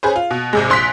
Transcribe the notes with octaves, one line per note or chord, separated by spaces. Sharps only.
C#4 G#4 B4 C5
F4
B2
G#1 C3 G#3
A#1 C6 F#6 B6